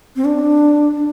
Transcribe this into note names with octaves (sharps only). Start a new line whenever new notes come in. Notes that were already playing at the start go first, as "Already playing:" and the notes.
C4
D4